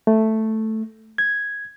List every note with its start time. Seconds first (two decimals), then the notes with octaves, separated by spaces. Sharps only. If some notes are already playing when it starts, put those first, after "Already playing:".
0.07 A3
1.18 G#6